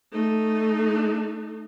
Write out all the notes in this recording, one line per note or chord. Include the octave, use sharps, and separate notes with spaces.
A3 D#4